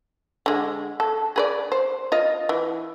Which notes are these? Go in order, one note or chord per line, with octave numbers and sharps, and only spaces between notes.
D3 G#3
A4
G#4 B4 D5
C5
F4 D#5
E3